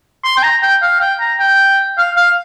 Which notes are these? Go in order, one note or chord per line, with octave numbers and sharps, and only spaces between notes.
C6
G5
A#5
G5
F5
G5
A#5
G5
F5
F5